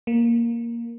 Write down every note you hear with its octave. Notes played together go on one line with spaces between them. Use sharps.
A#3